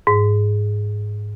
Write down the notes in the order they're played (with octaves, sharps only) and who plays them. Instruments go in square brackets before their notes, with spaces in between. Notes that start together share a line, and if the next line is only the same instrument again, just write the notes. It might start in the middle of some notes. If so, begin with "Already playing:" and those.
[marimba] G#2